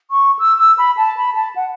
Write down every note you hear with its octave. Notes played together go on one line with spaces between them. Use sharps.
C#6
E6
E6
B5
A5
B5
A5
F#5